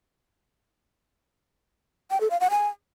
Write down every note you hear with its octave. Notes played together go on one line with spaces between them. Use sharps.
G5
A4
F5
F#5
G#5